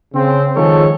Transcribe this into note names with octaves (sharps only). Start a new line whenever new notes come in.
C#3 C4
D#3 F3 G#3 G#4 A4 C#5